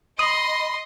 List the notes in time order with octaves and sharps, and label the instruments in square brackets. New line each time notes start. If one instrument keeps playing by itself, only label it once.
[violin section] D#5 [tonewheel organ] B5 [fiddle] C6 [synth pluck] D#6